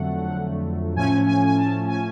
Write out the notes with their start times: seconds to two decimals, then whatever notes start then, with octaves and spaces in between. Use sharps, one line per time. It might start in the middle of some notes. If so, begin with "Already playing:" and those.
Already playing: F2 D3 F#3 A3 F#5
0.96 A2 F3 A3 C#4 G#5
1.27 G#5
1.46 G#5
1.57 A5
1.87 G#5